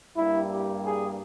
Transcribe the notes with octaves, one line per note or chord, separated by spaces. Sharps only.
G2 G3 A#3 E4
G4
G#4